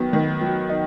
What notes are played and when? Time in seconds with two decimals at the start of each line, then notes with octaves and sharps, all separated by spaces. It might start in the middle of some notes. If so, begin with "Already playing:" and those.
Already playing: D#3 F#3 B3
0.13 D#3
0.41 F#3
0.69 D#4